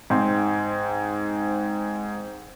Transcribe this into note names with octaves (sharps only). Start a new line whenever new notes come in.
G#2 C4 C6